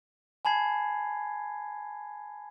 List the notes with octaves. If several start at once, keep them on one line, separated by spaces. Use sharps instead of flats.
G#5 A5 B5 G#6 C7